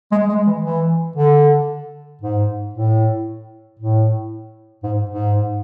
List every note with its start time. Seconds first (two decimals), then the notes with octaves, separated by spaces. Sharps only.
0.12 G#3
0.29 G#3
0.47 E3
0.64 E3
1.16 D3
2.22 G#2
2.74 A2
3.79 A2
4.83 G#2
5.10 G#2